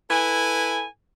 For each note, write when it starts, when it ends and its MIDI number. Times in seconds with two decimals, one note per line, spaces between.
0.10 0.83 64
0.10 0.83 69
0.10 0.83 71
0.10 0.83 80